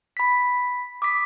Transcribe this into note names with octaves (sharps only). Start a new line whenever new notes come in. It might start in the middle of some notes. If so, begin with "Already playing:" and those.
B5 B6
D6 D#6 B6